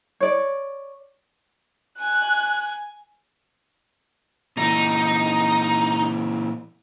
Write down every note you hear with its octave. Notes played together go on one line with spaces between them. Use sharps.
C#5 D5
G#5 F#6
A#2 E3 D#4